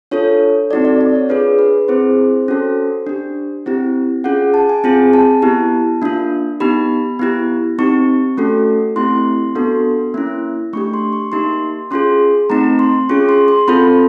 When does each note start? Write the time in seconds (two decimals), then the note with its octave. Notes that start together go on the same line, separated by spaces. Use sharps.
0.11 D4 F4 A4 C#5
0.71 C4 D#4 F#4 A4 D5
0.85 D5
1.01 D5
1.15 C#5
1.29 D4 F4 G#4 B4
1.59 B4
1.88 C4 E4 G#4 C5
2.48 C#4 F#4 A4
3.07 D4 G4
3.66 C4 E4 G4
4.24 C#4 F4 G#4 F#5
4.54 A5
4.69 G#5
4.84 C4 F4 G#4 G#5
5.13 A5
5.42 B3 E4 G4
6.02 A#3 D4 F4
6.60 B3 D#4 G4 B5
7.19 B3 E4 G4
7.78 C4 D#4 G4 C#6
8.37 A3 C#4 F#4 A4
8.96 A3 C4 E4 G4 C6
9.55 B3 D4 F#4 A4
10.14 A#3 C#4 E4
10.73 A3 D4 G4 C#6
10.94 C6
11.13 C#6
11.32 A#3 D#4 G4 C6
11.91 C#4 F4 G#4 C6
12.50 A3 C4 D#4 A#5
12.79 C6
13.09 C#4 F4 G#4 C#6
13.29 C6
13.48 C6
13.68 C4 F4 A4 B5